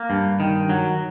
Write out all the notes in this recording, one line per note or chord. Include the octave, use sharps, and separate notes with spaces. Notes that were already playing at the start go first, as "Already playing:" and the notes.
Already playing: A#3
G2
D#3
F#3